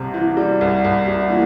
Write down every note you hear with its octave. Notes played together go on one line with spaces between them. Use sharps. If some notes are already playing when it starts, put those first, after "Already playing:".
Already playing: C2 C3
E3
G3
C2
C2
G3
A#2 E3